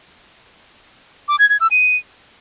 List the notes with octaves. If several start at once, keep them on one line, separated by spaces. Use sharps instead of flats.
D6
G#6
G#6
E6
D#7